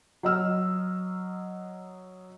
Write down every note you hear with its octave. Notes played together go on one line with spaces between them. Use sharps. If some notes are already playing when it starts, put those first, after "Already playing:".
F#3 D#5 E6 F6